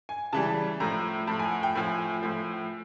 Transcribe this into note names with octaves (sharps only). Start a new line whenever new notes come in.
G#5
C#3 E3 G3 A5
A2 F3 A#5
A2 F3 A5
G#5
F#5
G5
A2 F3 G#5
A2 F3